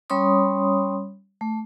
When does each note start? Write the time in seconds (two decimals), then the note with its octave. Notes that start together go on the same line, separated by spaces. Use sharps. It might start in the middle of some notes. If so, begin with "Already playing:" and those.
0.10 G3 C#4 C#5 B5 C6 D#6
1.41 A3